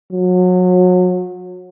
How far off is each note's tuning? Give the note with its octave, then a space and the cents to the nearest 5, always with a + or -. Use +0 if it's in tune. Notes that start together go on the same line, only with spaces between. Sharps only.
F#3 -30